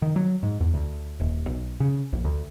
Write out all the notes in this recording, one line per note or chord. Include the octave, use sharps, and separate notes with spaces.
D#3
F#3
G#2
E2
D2
D#1
B1
C#3
A#1
D2